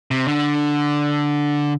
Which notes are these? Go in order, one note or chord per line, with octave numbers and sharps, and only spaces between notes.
C3
D3